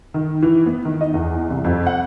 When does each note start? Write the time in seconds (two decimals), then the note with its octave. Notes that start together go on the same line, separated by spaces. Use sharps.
0.14 D#3
0.42 E3
0.66 B3
0.85 D#3
1.01 D#5
1.14 E2
1.50 C2
1.64 F2
1.87 F#5